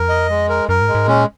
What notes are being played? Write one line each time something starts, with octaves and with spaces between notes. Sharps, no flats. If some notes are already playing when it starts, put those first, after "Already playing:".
Already playing: F2 A#4
D#5
G#3
A#4
F#2 A#4
G#2
G#3
G#2
A#2 C#4